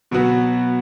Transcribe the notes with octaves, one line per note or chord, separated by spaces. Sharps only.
B2 F#3 B3 F#4